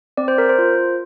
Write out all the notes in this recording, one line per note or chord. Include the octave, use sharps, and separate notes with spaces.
C4 D5
C5
A#4
C5
F4